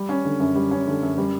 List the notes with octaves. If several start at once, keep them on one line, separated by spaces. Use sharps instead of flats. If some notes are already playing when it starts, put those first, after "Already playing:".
Already playing: G3
C#4
D3
F#2
G3
C#4
D3
F#2
G3